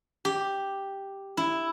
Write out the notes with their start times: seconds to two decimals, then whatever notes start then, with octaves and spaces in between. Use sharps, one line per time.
0.25 G4
1.37 E4